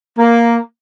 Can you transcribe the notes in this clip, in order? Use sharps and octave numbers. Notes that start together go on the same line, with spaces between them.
A#3